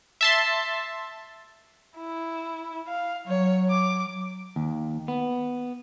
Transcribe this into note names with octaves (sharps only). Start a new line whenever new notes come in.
E5 A5 C6
E4
F5
F#3 C#5
D6
D#2
B3